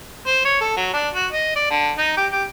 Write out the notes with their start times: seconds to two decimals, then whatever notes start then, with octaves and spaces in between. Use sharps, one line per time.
0.27 C5
0.45 C#5
0.61 A4
0.77 F#3
0.93 D4
1.14 F#4
1.33 D#5
1.56 D5
1.70 D3
1.98 D#4
2.17 G4
2.32 G4